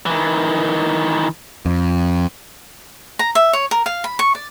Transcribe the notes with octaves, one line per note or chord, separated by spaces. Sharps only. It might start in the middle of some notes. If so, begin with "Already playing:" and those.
D#3 E3
F2
A#5
E5
C#5
A#4
F5
B5
C#6
D5